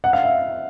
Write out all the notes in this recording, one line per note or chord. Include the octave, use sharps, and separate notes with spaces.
F#5
F5
E5